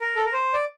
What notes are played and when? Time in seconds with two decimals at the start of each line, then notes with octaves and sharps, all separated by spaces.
0.01 A#4
0.16 A4
0.25 A#4
0.33 C5
0.54 D5